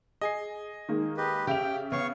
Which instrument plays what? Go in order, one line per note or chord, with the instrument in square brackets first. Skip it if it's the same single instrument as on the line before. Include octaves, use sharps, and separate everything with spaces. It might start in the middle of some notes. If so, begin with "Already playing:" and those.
[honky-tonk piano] G#4 [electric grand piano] D#5 G#5 C7
[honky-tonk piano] D#3 G#3 A#3
[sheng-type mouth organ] G4 B4 D#5
[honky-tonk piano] C#3 E5 F7 [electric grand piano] G4 [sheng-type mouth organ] G5
[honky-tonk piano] C#3 [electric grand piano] B3 [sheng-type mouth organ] C#5 F5 C#6